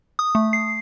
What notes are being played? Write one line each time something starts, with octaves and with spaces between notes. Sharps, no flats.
D#6
A3
C7